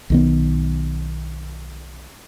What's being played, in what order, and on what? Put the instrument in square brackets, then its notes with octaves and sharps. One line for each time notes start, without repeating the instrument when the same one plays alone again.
[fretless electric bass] B1 D#3 B3